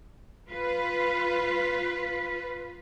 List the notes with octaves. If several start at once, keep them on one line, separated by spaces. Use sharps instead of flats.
F4 B4